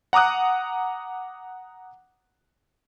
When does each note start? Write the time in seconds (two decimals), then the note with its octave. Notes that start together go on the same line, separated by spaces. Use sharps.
0.13 F#5 A#5 D6 D#6 F#6